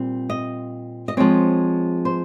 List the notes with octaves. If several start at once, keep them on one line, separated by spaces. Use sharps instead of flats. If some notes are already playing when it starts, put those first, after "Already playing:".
Already playing: A#2 G3 C4
D#5
D#5
F3 G#3 C4 C#5
C5